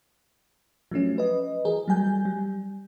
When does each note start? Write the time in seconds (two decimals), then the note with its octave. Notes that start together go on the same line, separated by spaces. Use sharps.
0.91 F3 F#3 A3 C#4
1.18 B4 D#5
1.65 E3 G#4 A#4
1.88 F#3 G3 G#5 G6
2.25 G3